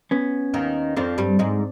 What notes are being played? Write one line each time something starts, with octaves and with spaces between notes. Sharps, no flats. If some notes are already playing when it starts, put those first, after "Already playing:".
B3 C#4
D#2 D#3
F2 F3 C4 D4
G2 G3
G#2 G#3